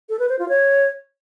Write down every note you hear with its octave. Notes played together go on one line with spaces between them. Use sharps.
A4
B4
C5
F4
C#5